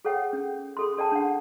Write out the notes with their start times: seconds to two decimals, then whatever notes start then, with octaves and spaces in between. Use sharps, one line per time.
0.05 G#4 A4 C#5 F#5 G5
0.33 C#4
0.77 G#4 A4 C6
0.97 A4 D5 G5 A5
1.12 D4 F#5